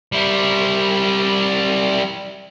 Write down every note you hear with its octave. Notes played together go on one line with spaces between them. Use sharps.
G3 E4